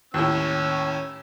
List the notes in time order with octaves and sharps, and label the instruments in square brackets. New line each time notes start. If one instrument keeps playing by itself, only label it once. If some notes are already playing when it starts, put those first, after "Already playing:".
[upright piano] D#2 A2 [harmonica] C#4 E6